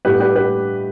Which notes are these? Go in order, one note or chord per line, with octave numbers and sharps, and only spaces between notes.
A2 G3 B3 G4 B4
G4 B4
G4 B4